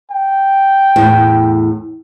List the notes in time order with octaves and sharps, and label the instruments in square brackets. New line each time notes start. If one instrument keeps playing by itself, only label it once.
[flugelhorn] G5
[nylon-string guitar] E2 A2